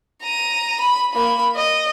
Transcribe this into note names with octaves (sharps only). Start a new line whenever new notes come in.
A#5 D#7
B5
A#3 B5
D#5